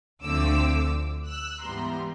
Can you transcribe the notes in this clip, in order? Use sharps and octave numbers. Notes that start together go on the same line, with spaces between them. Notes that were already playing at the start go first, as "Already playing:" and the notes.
D2 D3 F3 A3 C4 D6 E6
E6 F#6
G#2 E3 G3 B3 A#5 C6